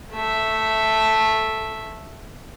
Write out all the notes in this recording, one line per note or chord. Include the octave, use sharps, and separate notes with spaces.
A3 E5